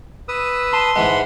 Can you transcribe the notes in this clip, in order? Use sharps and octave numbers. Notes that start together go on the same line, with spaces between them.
B4 D#6 E6
A5 C6
G#2 E3 G#3 F#5 B5